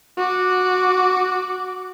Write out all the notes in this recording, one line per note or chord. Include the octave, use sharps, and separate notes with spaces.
F#4 D6